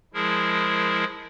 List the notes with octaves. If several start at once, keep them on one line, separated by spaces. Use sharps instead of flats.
F3 G#3 E4 G#4 A#4